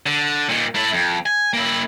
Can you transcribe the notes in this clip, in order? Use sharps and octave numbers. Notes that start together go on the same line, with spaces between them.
D3
A#2 D#3
A3 E4
F2
G#5
A#3 E4